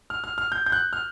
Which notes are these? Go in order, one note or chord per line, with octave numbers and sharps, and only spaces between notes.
F6
F6
F6
G6
G6
F#6
F6